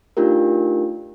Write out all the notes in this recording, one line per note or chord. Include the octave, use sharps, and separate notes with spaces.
A3 D4 D#4 F4 G4 A#4